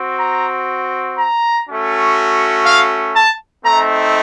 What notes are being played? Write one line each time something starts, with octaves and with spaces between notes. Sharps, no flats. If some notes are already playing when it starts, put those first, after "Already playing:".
Already playing: C4 F#4
A#5
A#5
A3 C#4 F#4
F5
A5
A3 C4 D#4 A#5